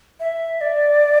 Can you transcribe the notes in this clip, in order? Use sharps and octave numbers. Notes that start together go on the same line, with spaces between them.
E5
D5